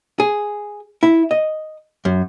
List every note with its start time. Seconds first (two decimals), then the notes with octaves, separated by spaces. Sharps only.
0.20 G#4
1.03 E4
1.31 D#5
2.05 F#2